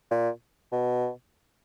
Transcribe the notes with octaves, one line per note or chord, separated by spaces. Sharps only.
A#2
B2